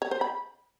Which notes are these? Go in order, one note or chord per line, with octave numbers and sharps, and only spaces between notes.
C#5
C5
B5